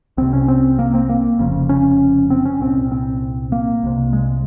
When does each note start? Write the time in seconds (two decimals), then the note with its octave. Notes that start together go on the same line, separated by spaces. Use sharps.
0.17 C2 C3 C4
0.33 C#4
0.48 C4
0.79 A#3
0.94 C4
1.09 A#3
1.39 F1 F2 C#3
1.69 C#4
2.30 C4
2.45 C#4
2.60 C2 A#2 C4
2.92 C4
3.52 A#3
3.83 C2 C3
4.13 G#3